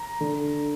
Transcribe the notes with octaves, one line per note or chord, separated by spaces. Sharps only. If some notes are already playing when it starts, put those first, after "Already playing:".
Already playing: A#5
D3